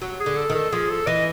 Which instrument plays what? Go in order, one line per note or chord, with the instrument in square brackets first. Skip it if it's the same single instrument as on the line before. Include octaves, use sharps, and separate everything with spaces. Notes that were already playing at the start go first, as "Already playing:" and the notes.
[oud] F#3
[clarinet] G#4
[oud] D3
[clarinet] A4
[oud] D#3
[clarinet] A4
[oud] F3 [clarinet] G#4
[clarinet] A4
[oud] E3 [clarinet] D#5